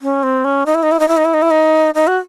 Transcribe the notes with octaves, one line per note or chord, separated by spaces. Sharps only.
C#4
C4
C#4
D#4
E4
D#4
E4
D#4
E4
D#4
E4
D#4
E4
D#4
D#4
F#4